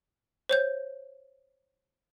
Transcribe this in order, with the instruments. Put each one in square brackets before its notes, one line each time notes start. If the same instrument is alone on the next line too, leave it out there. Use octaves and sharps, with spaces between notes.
[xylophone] C5 C#5 G6